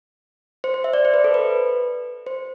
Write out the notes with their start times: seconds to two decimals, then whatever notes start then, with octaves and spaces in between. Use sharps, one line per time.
0.64 C5
0.74 C5
0.84 E5
0.93 D5
1.05 C5
1.14 B4
1.24 A4
1.34 B4
2.26 C5